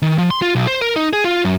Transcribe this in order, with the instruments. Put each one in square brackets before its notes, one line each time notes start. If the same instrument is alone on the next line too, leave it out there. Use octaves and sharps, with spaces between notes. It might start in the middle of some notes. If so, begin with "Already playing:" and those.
[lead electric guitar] D#3
F3
C6
F4
B1
C5
A#4
D#4
G#4
F4
F#2